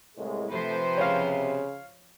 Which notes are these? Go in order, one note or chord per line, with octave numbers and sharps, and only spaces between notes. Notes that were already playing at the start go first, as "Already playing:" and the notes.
C2 A2 G#3
C3 F3 A3 B4 C5
C#3 C#5 F5